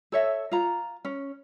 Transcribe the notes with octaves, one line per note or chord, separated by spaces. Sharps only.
A4 C#5 E5
F4 A#5
C#4